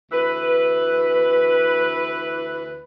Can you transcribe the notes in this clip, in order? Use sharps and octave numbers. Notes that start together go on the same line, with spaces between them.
D2 E3 B4